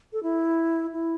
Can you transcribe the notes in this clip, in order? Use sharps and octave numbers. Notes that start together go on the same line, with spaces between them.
A4
E4
E4